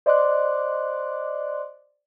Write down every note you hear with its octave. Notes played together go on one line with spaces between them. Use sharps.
C5 D5 D#5 C6 D6 F#6